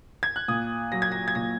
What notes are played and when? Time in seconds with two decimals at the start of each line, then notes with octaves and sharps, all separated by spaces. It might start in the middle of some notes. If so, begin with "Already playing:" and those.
0.23 G#6
0.36 F#6
0.48 A#2 D#6
0.92 F#3 A#6
1.02 G#6
1.12 A#6
1.28 G#6
1.35 A#2 A#6